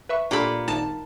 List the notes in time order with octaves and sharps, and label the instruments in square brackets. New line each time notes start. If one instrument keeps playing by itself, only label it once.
[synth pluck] B4 E5 C#6
[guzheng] A#2 B5 [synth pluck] D4 G4 A4
[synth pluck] G#1 D#4 [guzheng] A5